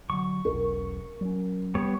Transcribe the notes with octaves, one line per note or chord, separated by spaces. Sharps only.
D3 E3 F#3 C#6
E1 B1 C#4 A#4
F#3 C#4
G3 B3 C#5